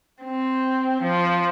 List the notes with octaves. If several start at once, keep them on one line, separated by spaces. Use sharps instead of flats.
C4
F3